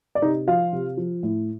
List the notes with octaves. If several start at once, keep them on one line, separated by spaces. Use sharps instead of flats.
D5
C3 D#4 D#5
F3 F4 F5
C3
F3
A2